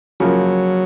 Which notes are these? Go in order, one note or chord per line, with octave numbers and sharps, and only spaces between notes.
C#3 F3 F#3 A#3